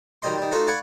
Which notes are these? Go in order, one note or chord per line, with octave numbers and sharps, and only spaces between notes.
D#3 F#3 G3 D#5 C6
D#3 G3
A3 D#4 F4 F#4 C5 F5
D5 F5 F#5 G#5 B5 C#6